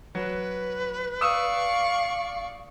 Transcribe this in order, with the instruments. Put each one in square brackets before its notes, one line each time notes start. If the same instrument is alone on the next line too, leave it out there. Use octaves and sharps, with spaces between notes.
[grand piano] F#3 [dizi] B4
[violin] D5 C#6 [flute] F5 [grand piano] D#6 E6 E7